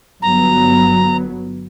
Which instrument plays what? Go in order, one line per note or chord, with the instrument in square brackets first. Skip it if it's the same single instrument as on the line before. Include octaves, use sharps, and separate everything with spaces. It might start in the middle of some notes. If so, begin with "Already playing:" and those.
[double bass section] G1 F#3 B3 [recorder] A#5